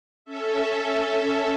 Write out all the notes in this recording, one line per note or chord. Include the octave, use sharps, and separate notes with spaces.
C#4 A4 E5